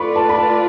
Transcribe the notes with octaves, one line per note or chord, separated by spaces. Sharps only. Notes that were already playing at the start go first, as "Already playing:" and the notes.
Already playing: A3 F4 B4 D5 B5 C#6
A5
B5
A5